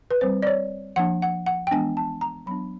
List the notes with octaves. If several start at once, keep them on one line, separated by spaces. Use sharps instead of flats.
B4
G3 C4 C5
D5
C#5
F3 A#3 D4 F#5
F#5
F#5
G5
E3 G#3 B3 D4 G#5
A5
A#5
F#3 B3 D4 B5